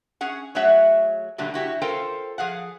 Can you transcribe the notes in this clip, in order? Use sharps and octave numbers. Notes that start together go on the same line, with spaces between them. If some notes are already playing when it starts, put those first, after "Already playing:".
C#4 G#4 F#5
F#3 A3 G#4 C#5 E5 F#5
A#2 D3 F#3 G3 A3
E4 F#4 G4
F4 A4 A#4 C5 F5 G5
F3 G#4 F5 F#5